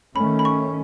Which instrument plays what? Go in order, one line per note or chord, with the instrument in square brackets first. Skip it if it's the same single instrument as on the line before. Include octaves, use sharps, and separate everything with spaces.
[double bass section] D#3 A3 C#4 [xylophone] B5
[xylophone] B5
C#6